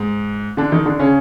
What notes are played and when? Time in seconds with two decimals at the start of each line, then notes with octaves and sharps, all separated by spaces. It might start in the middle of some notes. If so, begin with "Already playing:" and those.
Already playing: G#2
0.57 D3 D4
0.72 D#3 D#4
0.85 D3 D4
0.99 C#3 C#4